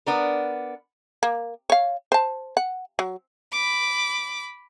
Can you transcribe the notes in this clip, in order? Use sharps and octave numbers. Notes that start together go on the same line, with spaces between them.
B3 D4 A#4
A#3
C#5 F5
C5 A5
F#5
F#3
B5 D6